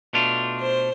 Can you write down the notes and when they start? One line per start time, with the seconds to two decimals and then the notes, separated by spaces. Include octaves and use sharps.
0.13 B2 A3 D4 F4
0.61 C5